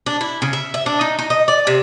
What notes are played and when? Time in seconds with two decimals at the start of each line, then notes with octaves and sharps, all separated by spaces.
0.06 D4
0.21 E4
0.42 C#3
0.53 E5
0.74 E5
0.86 D4
1.01 D#4
1.19 D#4
1.30 D#5
1.48 D5
1.67 C3